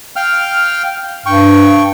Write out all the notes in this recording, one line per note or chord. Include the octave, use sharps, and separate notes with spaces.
F5 G5 F6
G2 G5 C#6